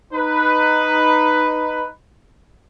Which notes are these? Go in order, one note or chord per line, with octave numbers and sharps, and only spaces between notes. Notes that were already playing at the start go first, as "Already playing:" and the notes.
D#4 B4